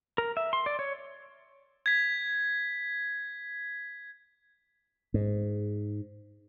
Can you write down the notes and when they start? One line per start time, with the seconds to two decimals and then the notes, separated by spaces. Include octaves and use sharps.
0.18 A#4
0.37 E5
0.53 C6
0.66 D5
0.79 C#5
1.86 G#6 B6
5.14 G#2